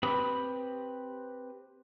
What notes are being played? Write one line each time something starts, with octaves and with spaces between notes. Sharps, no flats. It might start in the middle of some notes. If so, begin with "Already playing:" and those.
C4 G4 B4 B5 D#6